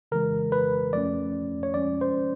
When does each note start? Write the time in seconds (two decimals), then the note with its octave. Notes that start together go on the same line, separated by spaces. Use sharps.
0.12 C#3 E3 G#3 A#4
0.52 B4
0.93 F3 A3 C#4 D5
1.63 C#5
1.74 F3 G#3 C#4 D5
2.01 C5